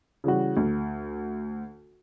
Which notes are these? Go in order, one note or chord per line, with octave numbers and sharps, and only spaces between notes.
C#3 E3 G3 F#4
D2